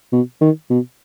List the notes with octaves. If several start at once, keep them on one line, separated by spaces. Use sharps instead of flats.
B2
D#3
B2